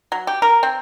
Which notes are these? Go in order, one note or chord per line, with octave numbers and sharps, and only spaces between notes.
F#3
G4
A#4
C4